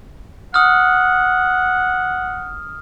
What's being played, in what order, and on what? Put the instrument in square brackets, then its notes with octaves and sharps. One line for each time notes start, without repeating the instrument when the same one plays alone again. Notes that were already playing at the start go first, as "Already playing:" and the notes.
[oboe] F#5 [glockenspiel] D#6 F6